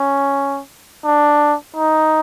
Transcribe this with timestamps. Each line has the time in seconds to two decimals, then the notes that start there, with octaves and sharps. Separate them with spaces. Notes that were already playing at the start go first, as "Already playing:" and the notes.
Already playing: C#4
1.04 D4
1.76 D#4